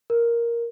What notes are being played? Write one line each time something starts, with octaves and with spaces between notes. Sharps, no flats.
A#4